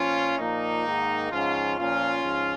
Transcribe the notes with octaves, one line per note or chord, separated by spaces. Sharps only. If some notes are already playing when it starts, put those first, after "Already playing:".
Already playing: A#2 F3 C#4 F4
A#2 F3 A#3 D#4
G#2 D#3
G#2 F3 C#4 F4
A#2 F3 C#4 F4
G#2 F3